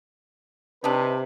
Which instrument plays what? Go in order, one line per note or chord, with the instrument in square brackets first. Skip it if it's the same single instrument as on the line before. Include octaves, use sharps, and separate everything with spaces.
[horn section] C3 [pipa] D4 D#4 [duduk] B4